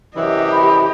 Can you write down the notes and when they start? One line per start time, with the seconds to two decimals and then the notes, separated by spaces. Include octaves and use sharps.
0.16 F#2 C3 E3 G4 D#5
0.52 B5